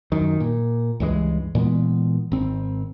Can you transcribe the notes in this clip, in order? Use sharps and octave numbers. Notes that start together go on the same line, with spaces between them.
F#2 D#3
A#2
C#2 G2 E3 G#3
A#2 E3 G#3 B3
G#1 C4